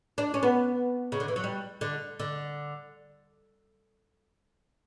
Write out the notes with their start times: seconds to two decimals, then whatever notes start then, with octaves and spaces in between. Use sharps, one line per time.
0.18 D4
0.34 C#4
0.43 B3
1.12 C#3
1.20 D3
1.28 E3
1.36 F#3
1.44 G3
1.81 D3
2.20 D3